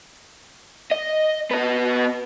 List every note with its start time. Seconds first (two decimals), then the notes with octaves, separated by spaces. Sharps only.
0.91 D#5
1.51 B3 D#5